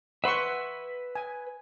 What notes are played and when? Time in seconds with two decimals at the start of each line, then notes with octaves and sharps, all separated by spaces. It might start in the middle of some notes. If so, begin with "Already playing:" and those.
0.24 B4 E5 F#5 C6 C#6
1.15 G#5